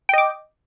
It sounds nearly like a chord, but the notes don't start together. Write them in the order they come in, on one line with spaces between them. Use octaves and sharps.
G5 D#5 D6